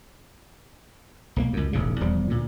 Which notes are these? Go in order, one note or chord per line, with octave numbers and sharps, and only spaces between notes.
B1 E3 A#3
C#2 F#2
E1 A1 G#2 C#3
D#1 E2 F3 G3
D2 A#2